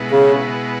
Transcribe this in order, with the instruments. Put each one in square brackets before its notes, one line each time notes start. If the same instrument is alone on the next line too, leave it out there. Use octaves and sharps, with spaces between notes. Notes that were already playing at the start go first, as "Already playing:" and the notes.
Already playing: [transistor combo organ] B2 G#3 B3 E4
[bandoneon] C#3